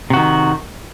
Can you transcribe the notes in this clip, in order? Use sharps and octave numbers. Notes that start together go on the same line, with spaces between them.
C3 D#3 F#4